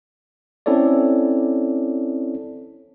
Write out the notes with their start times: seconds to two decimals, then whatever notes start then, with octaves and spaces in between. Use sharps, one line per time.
0.66 C4 C#4 E4 A4 C#5 D5